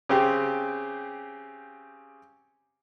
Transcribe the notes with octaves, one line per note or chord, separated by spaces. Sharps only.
C#3 C4 G4